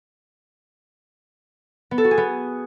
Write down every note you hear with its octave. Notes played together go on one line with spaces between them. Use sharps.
B3
A4
F#4
G#4
B3